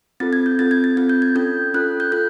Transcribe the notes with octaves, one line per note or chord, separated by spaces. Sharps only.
C4 F4 A4 A6
G#6
G6
C4 F4 A4 A6
G#6
A6
C4 F4 A4 G#6
G6
G#6
C#4 F4 A4 G6
C#4 F4 A4 F#6
G6
F4 A4 F#6